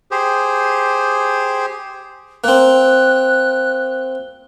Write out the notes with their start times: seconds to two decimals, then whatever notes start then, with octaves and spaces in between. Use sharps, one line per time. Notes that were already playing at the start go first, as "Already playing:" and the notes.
0.11 G4 G#4 C5
2.44 A#3 C4 F#6